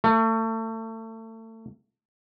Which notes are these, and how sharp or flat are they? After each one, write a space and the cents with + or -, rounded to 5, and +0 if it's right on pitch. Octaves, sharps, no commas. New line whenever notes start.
A3 +30